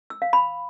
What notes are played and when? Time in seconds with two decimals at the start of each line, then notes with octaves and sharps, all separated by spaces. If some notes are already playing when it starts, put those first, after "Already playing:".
0.10 E6
0.22 F5
0.33 B5